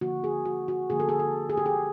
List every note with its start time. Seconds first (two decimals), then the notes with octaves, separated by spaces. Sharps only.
0.01 D3 F3 A#3 F#4
0.24 G#4
0.45 F#4
0.68 F#4
0.90 D3 F3 A#3 G#4
1.00 A4
1.09 G#4
1.19 A4
1.50 G#4
1.57 G4
1.66 G#4